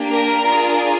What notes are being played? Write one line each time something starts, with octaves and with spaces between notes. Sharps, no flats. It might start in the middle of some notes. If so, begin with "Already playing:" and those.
Already playing: A#3 D4 G4
A#4
D4 F4 G#4